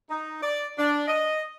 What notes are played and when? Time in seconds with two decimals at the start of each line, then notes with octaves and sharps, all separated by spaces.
0.10 D#4
0.43 D5
0.78 D4
1.08 D#5